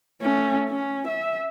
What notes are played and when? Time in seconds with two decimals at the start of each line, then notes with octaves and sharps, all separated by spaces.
0.21 A3 C#4
0.70 C#4
1.07 E5